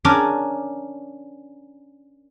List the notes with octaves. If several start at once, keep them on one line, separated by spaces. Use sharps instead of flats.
C#4 D4 A#4 D5